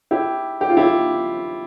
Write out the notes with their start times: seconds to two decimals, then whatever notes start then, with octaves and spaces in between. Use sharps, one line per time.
0.11 E4 G4
0.61 G4
0.69 F4
0.77 E4 G4